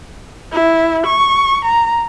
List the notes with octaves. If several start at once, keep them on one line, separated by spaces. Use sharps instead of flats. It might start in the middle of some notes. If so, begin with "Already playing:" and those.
E4
C#6
A#5